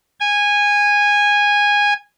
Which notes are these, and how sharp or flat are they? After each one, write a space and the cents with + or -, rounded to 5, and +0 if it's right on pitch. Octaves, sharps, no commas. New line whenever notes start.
G#5 -15